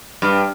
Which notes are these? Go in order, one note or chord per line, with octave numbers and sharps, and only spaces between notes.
G2